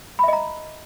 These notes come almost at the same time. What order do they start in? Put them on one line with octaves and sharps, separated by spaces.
B5 E5 D#5 A#5